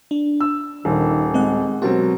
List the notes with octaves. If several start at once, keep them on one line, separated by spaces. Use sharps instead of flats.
D4
E6
D#1 D#3
G#3 C4 D#5 F#5
B2 F#3 C4 G4 A#4